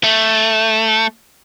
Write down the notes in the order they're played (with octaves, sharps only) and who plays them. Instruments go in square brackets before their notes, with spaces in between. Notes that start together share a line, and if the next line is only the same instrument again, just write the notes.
[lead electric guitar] A3